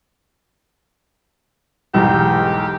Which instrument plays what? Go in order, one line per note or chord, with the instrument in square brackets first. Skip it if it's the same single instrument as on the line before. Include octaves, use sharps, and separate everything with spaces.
[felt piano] B1 E2 G#2 [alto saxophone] G4